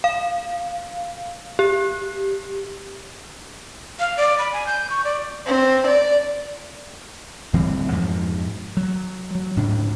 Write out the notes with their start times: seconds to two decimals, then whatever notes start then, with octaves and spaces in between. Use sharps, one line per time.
0.04 F5
1.59 G4
4.00 F5
4.17 D5
4.38 B5
4.53 G#5
4.67 G6
4.90 C#6
5.05 D5
5.47 C4
5.87 D5
7.53 D1 E3 G3 C4
7.92 F2 G#2 B2 F3
8.77 F#3
9.35 F#3
9.56 D2 G#2 C#3 D4